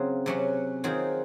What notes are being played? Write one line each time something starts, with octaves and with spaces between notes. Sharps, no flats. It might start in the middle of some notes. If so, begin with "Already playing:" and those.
Already playing: C#3 F#3 C4 F4
C3 F#3 C#4 F#4
D#3 F#3 C4 F4 G#4